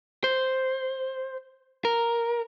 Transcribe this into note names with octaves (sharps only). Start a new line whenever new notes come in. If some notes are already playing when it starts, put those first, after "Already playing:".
C5
A#4